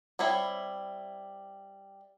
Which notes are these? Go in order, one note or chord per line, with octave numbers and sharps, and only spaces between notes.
G3 C4 E4 C#5